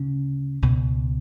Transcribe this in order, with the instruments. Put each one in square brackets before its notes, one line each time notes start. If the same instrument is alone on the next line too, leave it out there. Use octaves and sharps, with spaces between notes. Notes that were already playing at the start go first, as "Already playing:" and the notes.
Already playing: [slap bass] D2 C#3 C#4
C#2 B2